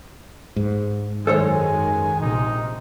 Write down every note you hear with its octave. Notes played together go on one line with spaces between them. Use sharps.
G#2
F#2 D#3 G#3 A4 C5 C#5 G#5
A#1 C3 D#4